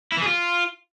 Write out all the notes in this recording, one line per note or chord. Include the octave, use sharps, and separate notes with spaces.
E4
E3
G#4
F4